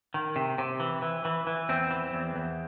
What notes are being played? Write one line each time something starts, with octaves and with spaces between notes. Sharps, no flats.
D#3
C3
C3
E3
E3
E3
E3
E2 C4
E3
E2
E2